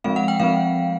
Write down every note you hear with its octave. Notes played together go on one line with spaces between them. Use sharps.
F3 G#3 C4 F5
F#5
G5
F3 G#3 C4 F5